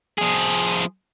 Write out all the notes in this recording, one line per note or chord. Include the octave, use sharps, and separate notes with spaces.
F3 G#4